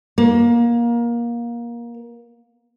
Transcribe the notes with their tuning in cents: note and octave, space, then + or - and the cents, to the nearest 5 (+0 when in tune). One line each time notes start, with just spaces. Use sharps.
A#3 +20